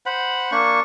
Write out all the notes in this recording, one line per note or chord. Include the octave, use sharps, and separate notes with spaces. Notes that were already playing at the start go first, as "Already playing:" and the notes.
C5 F#5 B5
A#3 D4 C#6